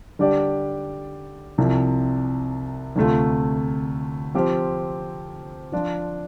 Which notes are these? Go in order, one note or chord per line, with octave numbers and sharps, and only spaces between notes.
D3 G3 D4 G4 D5
C2 C3 F3
D2 C3 A3 F4
F3 C4 G4 C5
F3 D4 F4